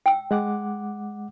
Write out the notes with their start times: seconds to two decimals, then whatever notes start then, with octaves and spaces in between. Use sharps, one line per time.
0.06 G5 E6
0.31 G#3 F#5 D6